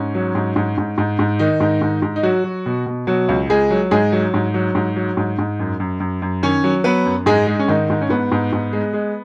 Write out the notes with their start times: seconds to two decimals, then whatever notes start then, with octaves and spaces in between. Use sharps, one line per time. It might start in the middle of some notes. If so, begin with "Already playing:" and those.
Already playing: G#2 C#4
0.15 F#3
0.35 G#2
0.56 G#2
0.78 G#2
0.98 G#2
1.19 G#2
1.39 D#3 D#4
1.60 G#2
1.81 G#2
2.02 G#2
2.16 D#4
2.23 F#3 F#4
2.44 F#3
2.66 B2
2.86 B2
3.07 B2 F#3 F#4
3.29 C#2
3.49 C#2 G#3 G#4
3.71 F#3
3.91 G#2 G#3 G#4
4.12 F#3
4.34 G#2
4.54 F#3
4.75 G#2
4.96 F#3
5.17 G#2
5.39 G#2
5.59 F#2
5.80 F#2
6.00 F#2
6.22 F#2
6.43 D#3 C#4 C#5
6.64 F#3
6.84 F#3 B3 B4
7.06 F#2
7.26 G#2 G#3 G#4
7.47 G#3
7.59 C#4
7.68 G#2 D#3 D#4
7.90 G#2
8.01 C#4
8.10 G#2 B3
8.32 G#2
8.53 G#2
8.73 G#3
8.93 G#3